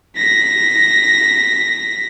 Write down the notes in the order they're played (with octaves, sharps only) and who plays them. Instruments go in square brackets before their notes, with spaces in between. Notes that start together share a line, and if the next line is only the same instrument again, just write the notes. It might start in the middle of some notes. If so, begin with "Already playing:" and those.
[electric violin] A#6 B6